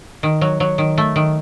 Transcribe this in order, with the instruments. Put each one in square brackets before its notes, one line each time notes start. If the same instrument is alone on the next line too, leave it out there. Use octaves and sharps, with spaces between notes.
[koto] D#3
F#3
F#3
D#3
A3
D#3